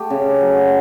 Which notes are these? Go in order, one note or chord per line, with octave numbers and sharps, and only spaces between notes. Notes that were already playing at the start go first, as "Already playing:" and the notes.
Already playing: A3 G4
C#3
F#3